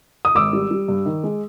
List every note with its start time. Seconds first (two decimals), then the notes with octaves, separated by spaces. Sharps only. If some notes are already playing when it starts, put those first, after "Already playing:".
0.25 D#6
0.35 G#1 D6 E6
0.53 G3
0.71 G3
0.88 G2
1.06 D#3
1.24 G#3